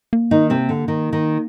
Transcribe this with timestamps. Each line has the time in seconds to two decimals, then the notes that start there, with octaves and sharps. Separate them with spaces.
0.13 A#3
0.31 D#3 D#4
0.50 C3 C4
0.69 D3
0.88 D#3
1.13 D#3